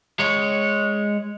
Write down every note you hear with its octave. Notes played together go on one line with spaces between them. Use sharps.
G#3 C#5